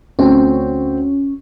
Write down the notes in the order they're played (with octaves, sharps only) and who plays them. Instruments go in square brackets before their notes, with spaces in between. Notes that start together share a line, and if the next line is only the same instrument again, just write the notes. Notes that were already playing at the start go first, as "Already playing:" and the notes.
[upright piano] D2 C4 G5 [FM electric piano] C#4